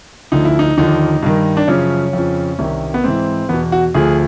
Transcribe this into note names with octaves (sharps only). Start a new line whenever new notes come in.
D2 D3 F3 D#4
E4
D#4
D#2 D3 F3 D#4
G2 D#3
D4
F#2 C#3 F3 C#4
F2 C#3 F3
C2 C3 D#3
B3
G#2 E3 C4
E2 B2 B3
F#4
D2 D3 F3 G#4